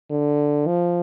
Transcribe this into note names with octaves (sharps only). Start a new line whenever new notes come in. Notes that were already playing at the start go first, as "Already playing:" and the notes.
D3
F3